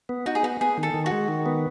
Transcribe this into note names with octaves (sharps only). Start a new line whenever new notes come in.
B3
D#4 F#4
G#4
B3 F#4
B3 G#4
D#3
A4
D#3
F#4
G#3
D#3
B3